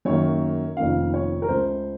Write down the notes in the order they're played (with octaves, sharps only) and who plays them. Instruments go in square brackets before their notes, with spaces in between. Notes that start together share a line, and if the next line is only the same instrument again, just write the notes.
[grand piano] F#2 D#3 A#3 C#5
F1 F2 D#3 A#3 C#4 F5
C#5
A#4
C#2 C#3 A3 C5